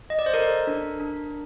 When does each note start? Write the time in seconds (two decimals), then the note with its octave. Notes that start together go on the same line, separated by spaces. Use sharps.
0.10 D#5
0.19 D5
0.26 C5
0.34 A4 A#4
0.67 D4
1.00 D4